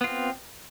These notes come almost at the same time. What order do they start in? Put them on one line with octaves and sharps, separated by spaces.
B3 F4 C4